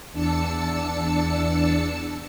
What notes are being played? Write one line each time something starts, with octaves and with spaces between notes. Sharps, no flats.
E2 D4 A5 E6 C#7